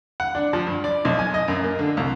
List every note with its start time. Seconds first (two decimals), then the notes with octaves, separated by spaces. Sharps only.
0.20 F#5
0.35 D4
0.53 F3
0.67 G2
0.84 D5
1.05 B1
1.19 G#5
1.34 D#5
1.48 F#2
1.64 A#3
1.79 D3
1.97 C2